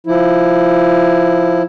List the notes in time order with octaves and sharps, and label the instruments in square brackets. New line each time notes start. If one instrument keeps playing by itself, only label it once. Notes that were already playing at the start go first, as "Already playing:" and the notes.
[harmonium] F3 E4